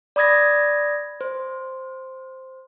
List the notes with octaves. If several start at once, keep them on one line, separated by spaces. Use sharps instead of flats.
D5 B5 D#6 G#6 A#6
C5